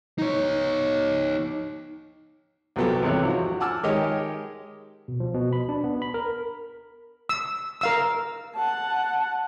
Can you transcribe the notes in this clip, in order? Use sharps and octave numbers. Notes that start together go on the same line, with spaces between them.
D#4 C#5
C2 A#2 F#3 B3 G4 A4
G#1 E2 C3 G4 C#5 F#6
F3 F#4
F#5 G#5 A5 D6 E6 F6
D#3 G#3 G4 A#4 C#5 D#5
B2
F3
B2
B5
D4
B3
B5
A#4
E6
A#4 F5 E6
F#5 A5